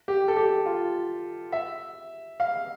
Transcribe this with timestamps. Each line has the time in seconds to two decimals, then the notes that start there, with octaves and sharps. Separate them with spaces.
0.08 G4
0.28 A4
0.37 G4
0.66 F4
1.52 E5
2.40 F5